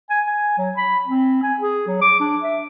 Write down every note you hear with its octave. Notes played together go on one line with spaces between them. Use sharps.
G#5
G#5
F#3
B5
C4
G#5
G#4
F#3
D6
D4
E5